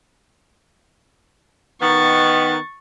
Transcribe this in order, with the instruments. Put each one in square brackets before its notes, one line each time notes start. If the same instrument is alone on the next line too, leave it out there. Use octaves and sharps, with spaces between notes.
[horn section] D#3 B3 [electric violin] C#6 A6